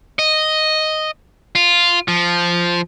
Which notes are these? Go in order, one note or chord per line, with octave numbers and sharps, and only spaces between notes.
D#5
F4
F3